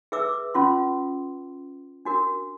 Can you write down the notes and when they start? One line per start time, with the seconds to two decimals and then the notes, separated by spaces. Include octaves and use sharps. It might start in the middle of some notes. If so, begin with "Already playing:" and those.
0.12 G#4 B4 E5 D6 E6
0.54 C#4 F4 C6
2.05 D4 F#4 A#4